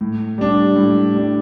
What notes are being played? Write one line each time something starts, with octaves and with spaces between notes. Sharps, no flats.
A2
G3 D4
A2
G3 D4